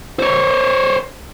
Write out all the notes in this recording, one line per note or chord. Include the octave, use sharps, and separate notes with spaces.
C5 C#5